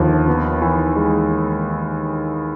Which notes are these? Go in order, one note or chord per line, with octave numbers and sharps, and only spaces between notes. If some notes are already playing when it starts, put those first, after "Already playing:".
Already playing: D#2 D3 F3
B3
E3
G#3